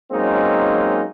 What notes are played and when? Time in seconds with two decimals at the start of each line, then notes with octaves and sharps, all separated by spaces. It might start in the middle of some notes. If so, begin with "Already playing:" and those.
0.12 F#3 G#3 A#3 C4 C#4 D#4